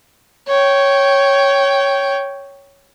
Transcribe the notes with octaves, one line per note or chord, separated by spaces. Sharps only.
C#5 G5